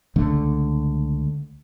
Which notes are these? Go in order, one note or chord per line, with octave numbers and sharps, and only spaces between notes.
C#2 D3 A3